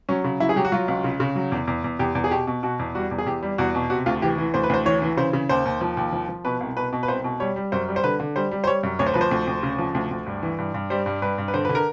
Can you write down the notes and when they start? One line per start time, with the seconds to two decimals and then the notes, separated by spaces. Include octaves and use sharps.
0.09 F#3 C#4
0.24 C#3
0.40 F#3 E4
0.49 G#4
0.56 F#3 G4
0.65 F#4
0.72 F#3 F4
0.88 C#2
1.04 C#3
1.20 C#3
1.36 F#3
1.52 E2
1.67 E2
1.84 E2
1.99 E2 G4
2.15 E2
2.24 G#4
2.31 B2 G4
2.47 B2
2.63 B2 F#4
2.79 E2
2.95 G3 F#4
3.11 E2
3.18 G#4
3.26 E2 G4
3.43 G3
3.58 E2 F#4
3.75 B2
3.90 C3 F#4
4.06 D2 F4
4.22 E3 G4
4.38 E3
4.54 D2 C5
4.63 B4
4.70 D2 C5
4.85 E3 C#5
5.02 E3
5.17 C#3 C5
5.33 C#3
5.49 D#2 C5
5.65 D#2
5.81 F3
5.97 D#2
6.13 F3
6.28 F3
6.45 B2 B4
6.60 C2
6.77 B2 B4
6.93 B2
7.03 B4
7.08 C2 C5
7.24 B2
7.40 G3 C#5
7.56 G3
7.72 F#2 C5
7.88 G3
7.96 C5
8.04 D3 B4
8.20 D3
8.36 G3 C5
8.51 G3
8.64 C5
8.67 G3 C#5
8.83 F#2
8.99 D2 C#5
9.06 C5
9.14 F3 B4
9.21 C5
9.31 D2
9.47 D2
9.63 C#3
9.79 F3
9.95 D2
10.11 D2
10.26 G2
10.43 E3
10.58 G2
10.74 G2
10.90 G3 C5
11.06 G2
11.22 G2 B4
11.38 G2
11.48 B4
11.54 D3 C5
11.65 D3 B4
11.75 A#4